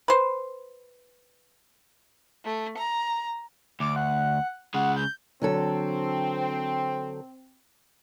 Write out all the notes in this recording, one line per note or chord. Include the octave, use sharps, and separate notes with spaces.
B4 C5
A3
A#5
D2 D6
F#5
C#3 G#3 F#5
G6
D3 F#3 C4 A4